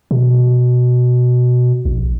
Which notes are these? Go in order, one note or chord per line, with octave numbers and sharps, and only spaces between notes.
B2
A#1